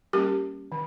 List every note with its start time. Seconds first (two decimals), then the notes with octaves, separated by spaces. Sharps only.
0.13 G3 A#3 C#4 G4 A#4
0.72 D#3